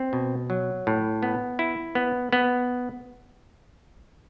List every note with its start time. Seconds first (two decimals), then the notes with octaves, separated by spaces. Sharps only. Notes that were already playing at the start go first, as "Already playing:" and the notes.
Already playing: C4
0.13 B2
0.50 F#3
0.87 A2
1.23 B3
1.59 E4
1.95 B3
2.33 B3